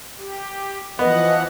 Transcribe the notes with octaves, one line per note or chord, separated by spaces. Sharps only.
G4
E3 F3 B3 D#5 F#5